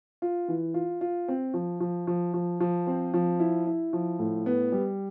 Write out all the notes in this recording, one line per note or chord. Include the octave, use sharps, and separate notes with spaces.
F4
E3
F4
F4
C4
F3
F3
F3
F3
F3
C4
F3
E4
E4
F3
A2
B3
G3